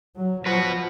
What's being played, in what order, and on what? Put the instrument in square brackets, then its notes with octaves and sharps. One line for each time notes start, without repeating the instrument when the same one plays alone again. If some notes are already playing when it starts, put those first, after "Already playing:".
[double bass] F#3
[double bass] F3 [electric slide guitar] F#4 B4